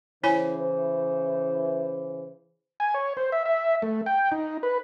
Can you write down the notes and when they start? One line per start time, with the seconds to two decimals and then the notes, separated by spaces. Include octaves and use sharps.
0.24 C#3 E3 E4 C5 C#5 G#5
2.80 G#5
2.94 C#5
3.17 C5
3.32 E5
3.46 E5
3.82 A3
4.06 G5
4.32 D#4
4.63 B4